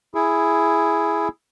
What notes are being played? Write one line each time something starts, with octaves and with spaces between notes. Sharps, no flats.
E4 G#4